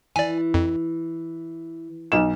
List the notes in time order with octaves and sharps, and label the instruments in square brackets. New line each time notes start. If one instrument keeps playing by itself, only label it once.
[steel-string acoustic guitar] E3 [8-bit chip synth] D5 G#5
[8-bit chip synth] F2
[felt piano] B1 E7